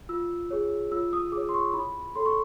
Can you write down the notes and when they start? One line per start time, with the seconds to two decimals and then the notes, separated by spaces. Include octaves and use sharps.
0.09 F4 E6
0.51 G#4 C#5
0.91 F4 E6
1.13 D#6
1.32 G#4 C#5 D6
1.49 C6
1.54 C#6
1.73 E4 B5
2.16 A4 C#5 C6
2.26 C#6